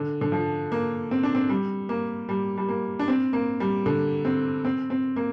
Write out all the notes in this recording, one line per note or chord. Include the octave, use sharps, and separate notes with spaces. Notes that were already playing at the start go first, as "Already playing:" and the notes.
Already playing: D3
D3
F3
A#3
C4
D4
C4
G3
A#3
G3
G3
A#3
D4
C4
A#3
G3
D3
C4
C4
C4
A#3